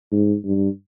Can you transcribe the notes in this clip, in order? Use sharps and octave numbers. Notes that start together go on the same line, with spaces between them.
G#2
G2